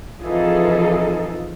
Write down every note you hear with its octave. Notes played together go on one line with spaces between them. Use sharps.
F2 E3 D#4 F4 G#4 A4